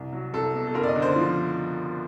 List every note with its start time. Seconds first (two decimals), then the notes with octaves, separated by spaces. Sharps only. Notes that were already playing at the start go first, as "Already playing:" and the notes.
Already playing: C2
0.13 F#3
0.34 C2 A4
0.55 B2
0.67 A4
0.74 F#1 A#4
0.83 D5
0.88 D#5
0.95 D3
1.02 C5
1.16 F3